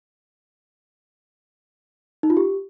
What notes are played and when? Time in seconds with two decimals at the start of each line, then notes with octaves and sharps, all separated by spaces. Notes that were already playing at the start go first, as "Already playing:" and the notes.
2.23 D#4
2.30 F4
2.37 G4